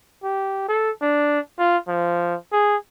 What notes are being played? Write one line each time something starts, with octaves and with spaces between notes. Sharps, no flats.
G4
A4
D4
F4
F3
G#4